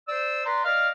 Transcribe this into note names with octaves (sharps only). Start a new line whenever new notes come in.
C5 D5 E6
B4 D5 A#5 C6
D5 D#5 F5 F6